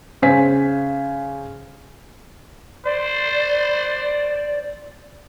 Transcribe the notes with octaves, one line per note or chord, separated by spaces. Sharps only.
C#3 C5 G#5 B6
C5 D5